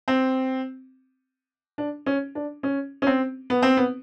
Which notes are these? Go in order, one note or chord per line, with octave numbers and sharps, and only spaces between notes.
C4
D4
C#4
D4
C#4
C#4
C4
B3
C4
B3